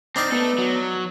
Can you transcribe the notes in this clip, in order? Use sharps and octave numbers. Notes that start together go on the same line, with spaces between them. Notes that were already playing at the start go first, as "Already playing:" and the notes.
C4 D4 D#4 F5
A3 B3 A4
F#3